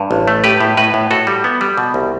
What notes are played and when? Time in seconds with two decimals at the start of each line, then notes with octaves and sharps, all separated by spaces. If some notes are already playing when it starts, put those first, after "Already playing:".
Already playing: G2
0.11 A1
0.28 A3
0.44 A2 G4 B4
0.60 A2
0.77 A2 B4 D#5
0.94 A2
1.11 A2 F#4 A4
1.27 G3
1.44 B3
1.61 G3
1.78 B2
1.94 C2